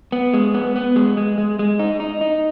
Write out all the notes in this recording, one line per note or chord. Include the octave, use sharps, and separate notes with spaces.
B3
G#3
B3
B3
G#3
G#3
G#3
G#3
D#4
D#4
D#4